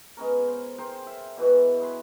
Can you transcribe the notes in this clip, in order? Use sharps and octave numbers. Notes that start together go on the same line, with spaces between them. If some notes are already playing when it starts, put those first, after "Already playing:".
G#3 B3 C#4 A#4
C5
G#4 A#4 C5 G5
E5
B2 E3 G#3 F#4
G#4 B5 C6